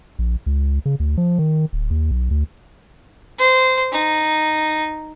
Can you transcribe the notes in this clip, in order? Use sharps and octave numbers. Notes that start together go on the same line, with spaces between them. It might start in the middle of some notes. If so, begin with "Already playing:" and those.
A#1
C#2
C#3
D2
F3
D#3
D1
D#2
B1
D2
C5
D#4